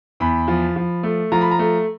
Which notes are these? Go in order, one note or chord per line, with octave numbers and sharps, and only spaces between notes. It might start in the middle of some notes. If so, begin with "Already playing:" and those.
E2 B5
F3
F3
A3
F3 A#5
B5
A#5
A3